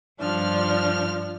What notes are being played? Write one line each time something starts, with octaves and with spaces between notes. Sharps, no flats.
G2 F3 D4 F6